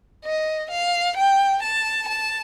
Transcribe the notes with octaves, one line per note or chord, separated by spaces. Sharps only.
D#5
F5
G5
A5
A5